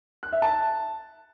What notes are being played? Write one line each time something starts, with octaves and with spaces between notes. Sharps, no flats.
F#6
E5
A5